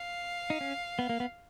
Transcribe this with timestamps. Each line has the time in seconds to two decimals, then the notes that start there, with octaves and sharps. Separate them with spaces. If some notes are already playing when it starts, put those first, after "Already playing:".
Already playing: F5
0.50 D#4
0.61 C#4
0.99 B3
1.09 A#3
1.20 B3